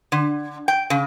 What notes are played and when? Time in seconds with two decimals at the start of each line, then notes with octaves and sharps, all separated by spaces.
0.12 D3
0.68 G5
0.90 C#3